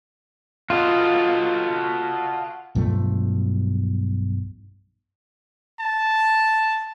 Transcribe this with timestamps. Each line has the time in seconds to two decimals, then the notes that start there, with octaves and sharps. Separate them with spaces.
0.70 F4 F#4 A4 D#5
2.75 B1 G2 F3 A3
5.80 A5